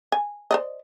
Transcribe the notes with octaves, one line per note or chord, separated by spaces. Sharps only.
G#5
C5 D5 D#5